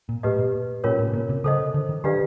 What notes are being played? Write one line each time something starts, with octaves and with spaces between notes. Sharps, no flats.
A#2
A2 G4 B4 D#5
A#2
A#2 C#4 F4 A#4 C#5
A2
B2
A#2
C3
C#3 A4 C5 D#5
D3
D#3
D#3 D4 G4 B4 D5 F5